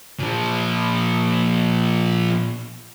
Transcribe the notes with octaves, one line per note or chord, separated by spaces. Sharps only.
A#2 F3